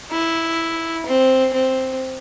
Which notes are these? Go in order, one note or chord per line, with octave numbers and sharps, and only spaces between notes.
E4
C4
C4